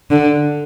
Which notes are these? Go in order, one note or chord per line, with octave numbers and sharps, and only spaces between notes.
D3